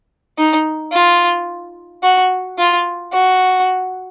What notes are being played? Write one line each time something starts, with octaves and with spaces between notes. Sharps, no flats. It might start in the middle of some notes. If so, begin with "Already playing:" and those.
D#4
F4
F#4
F4
F#4